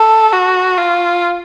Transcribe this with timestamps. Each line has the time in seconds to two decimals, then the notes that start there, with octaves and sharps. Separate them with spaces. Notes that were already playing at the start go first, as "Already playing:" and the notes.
Already playing: A4
0.32 F#4
0.78 F4